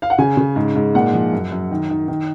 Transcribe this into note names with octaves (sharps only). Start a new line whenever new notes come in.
F5
F#5
C#3 G#5
C#3
G#2
G#2
A#2 F#5
F3
F#2
F#2
D#3
D#3
D#3